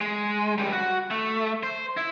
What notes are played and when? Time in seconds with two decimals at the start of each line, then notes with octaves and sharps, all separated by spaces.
0.01 G#3
0.58 C#2 G3
0.73 F#4
1.11 A3
1.63 C5
1.97 E4